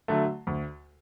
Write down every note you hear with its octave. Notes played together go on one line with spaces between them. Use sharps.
D3 F#3 A3
D2